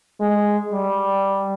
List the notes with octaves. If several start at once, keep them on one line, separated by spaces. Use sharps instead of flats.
G#3
G3